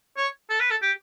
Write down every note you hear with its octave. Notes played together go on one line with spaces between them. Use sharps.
C#5
A4
B4
A4
G4